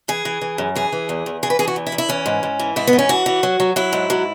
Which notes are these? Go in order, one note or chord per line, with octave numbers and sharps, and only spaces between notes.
E3 G#4
E3
E3
F#2
E3 G#4
E3
E2
E2
E3 G#4
B4
E3 G#4
F#4
E2
E4
E2
E4
E3 C#4
G#2
G#2
E3
G#2 E4
B3
E3
C#4
E3 F#4
E3
F#3
F#3
F#3 E4
G#2
F#3